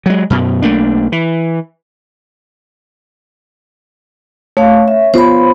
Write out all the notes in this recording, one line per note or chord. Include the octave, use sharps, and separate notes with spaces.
F#3 G#3
F#2 B2
B1 A3 A#3 D4
E3
A3 C#5 F5
E5
B3 F4 C5 B5